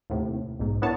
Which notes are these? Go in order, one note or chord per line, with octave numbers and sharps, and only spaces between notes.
D#2 A2 C3
B1 G#2
B3 D4 E4 A#4 C#5 A5